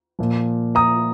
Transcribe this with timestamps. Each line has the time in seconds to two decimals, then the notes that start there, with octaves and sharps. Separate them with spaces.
0.19 A#2 F3
0.75 A#5 D#6